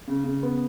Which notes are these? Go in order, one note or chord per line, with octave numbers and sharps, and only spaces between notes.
C#3
C#3
B3